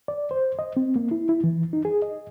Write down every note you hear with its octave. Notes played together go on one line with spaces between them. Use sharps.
D5
C5
D#5
C4
A#3
E4
E4
E3
D#4
G#4
D#5